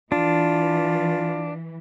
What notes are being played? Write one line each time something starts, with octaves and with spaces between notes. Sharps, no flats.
E3 D4 F4